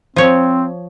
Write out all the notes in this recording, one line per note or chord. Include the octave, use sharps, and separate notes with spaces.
F3 C4 C#5